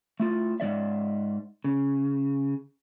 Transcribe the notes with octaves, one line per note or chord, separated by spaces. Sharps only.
A3 E4 F4
G#2 G#3 D5 E5
C#3